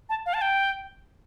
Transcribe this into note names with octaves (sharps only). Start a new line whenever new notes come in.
A5
F5
A5
G5